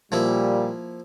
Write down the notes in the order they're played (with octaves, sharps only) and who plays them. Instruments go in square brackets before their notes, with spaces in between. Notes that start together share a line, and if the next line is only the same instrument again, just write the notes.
[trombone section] A#2 G3 [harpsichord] F3 A#3 E4